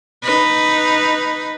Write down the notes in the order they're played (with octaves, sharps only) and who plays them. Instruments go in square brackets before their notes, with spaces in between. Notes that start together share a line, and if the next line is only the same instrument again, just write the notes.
[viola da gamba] D#4 B4